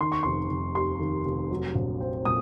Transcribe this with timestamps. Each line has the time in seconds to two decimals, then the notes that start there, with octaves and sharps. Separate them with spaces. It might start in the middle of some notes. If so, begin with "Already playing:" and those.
0.01 D#3 C6
0.12 C#6
0.23 F1 C6
0.50 F1
0.75 D#2 C6
1.00 D#3
1.26 F1
1.51 F#3
1.75 A#1
2.00 C4
2.25 A#2 D#6